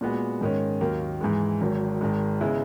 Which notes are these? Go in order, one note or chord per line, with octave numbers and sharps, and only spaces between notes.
A#2 G#3 B3 F#4
G#2 D#3 G#3 C#4
D#2 D#3 F#3 A#3
G#2 E3 G#3
G#1 G#2 D#3 F#3
G#1 G#2 D#3 G#3
C#3 G#3 B3 E4